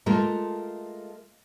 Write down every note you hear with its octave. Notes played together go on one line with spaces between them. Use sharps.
G#3 A3 F4 A#4 A5